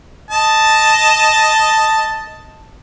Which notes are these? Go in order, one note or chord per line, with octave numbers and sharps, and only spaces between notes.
D#5 A5